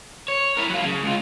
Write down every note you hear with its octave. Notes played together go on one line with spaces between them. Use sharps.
C#5
E4 A#4
F#3 F4
C#3
C#2 F4